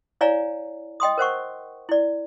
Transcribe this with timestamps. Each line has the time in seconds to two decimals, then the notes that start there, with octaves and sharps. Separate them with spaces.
0.21 E4 C#5 D5 F5 G#5 A#5
1.00 D#5 G5 C6 D#6
1.18 A#4 C5 F#5 C#6
1.89 E4 D5